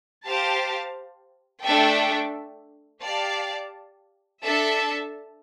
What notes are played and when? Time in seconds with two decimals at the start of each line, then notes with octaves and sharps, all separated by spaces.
0.25 G4 C5 F5 A5
1.64 A3 D4 A4 E5 G5
3.03 G4 D5 F5 A5
4.42 D4 A4 E5 A5